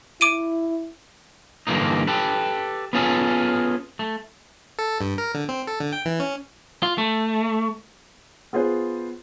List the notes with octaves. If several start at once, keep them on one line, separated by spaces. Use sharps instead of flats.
E4 D6 D7 D#7
G2 D3 E3 A#3 D#4
G4 A4 B4
B3 C#4 F4 G#4 A4
A3
A4
G2
A#4
D3
C4
A4
D3
G5
E3
C#4
F4
A3
B3 F4 G#4 B4 C5